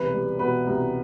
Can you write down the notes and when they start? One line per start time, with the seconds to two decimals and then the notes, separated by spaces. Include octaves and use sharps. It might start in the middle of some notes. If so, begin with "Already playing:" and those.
Already playing: E1 C2 B4
0.13 G3
0.39 B2 B4
0.67 C2